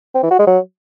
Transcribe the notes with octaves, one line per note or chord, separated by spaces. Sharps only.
C4
E3
F#4
G#3
F#3